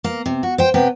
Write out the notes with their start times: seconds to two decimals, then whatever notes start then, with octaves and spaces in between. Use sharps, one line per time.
0.04 A#3
0.26 C3
0.43 F#4
0.58 C5 G5
0.74 C3 B3 G5